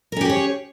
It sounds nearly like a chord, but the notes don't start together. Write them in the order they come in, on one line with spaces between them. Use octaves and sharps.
A#4 C#4 G4 G#4 C#5